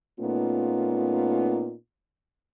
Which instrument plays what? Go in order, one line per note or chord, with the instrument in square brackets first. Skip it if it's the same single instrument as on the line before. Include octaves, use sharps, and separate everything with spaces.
[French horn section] A#2 A3 B3 C#4 D#4 F4